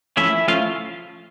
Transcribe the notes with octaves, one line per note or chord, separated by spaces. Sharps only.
F3 A3 C#4 E4 E5
F3 A3 C#4 F4 F5